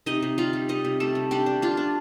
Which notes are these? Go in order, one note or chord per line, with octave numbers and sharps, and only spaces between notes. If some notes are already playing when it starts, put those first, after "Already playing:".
C3 D#4 D#5
C3
G3 F4 F5
G3
C3 D#4 D#5
C3
G3 A3 A4
C3
G3 D4 G4
D4
D4 F4
D4